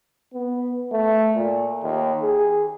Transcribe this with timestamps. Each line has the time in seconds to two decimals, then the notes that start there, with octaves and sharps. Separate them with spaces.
0.34 B3
0.92 A3
1.35 A#2
1.83 D#2
2.22 G#4